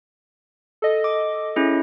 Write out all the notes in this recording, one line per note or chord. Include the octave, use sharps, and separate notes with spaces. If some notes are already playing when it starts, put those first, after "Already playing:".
A4 D#5
D6
C#4 E4 G#4